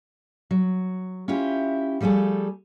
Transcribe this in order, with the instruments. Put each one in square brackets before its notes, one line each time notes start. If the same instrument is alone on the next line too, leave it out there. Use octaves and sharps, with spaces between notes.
[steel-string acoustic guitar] F#3
C#4 E4 F4 G4
F3 G3 A3 G#4 A4